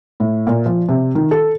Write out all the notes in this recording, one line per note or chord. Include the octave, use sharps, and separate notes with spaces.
A2
A#2
F3
C3
D#3
A4